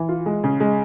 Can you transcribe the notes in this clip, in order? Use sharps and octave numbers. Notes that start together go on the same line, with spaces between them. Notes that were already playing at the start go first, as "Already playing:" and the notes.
Already playing: E3
F4
G#3
C#3
G#3